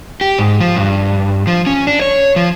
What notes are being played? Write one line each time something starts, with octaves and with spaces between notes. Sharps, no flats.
G4
G#2
F3
G2
F3
C#4
D4
C#5
F3